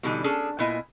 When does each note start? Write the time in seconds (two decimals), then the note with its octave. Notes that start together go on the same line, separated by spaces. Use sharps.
0.03 B2 D3 E3 G3 D#4 G#5
0.24 C#4 D4 G#4 A4
0.59 A#2 B3 E4 D#5 G#5